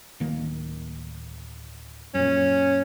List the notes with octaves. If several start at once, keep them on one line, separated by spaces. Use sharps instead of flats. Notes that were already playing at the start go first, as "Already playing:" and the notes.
D1 D#3 A#3
F#2 A#2 C#4